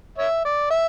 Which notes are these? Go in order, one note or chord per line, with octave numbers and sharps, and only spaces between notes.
C#5 E5
D5
E5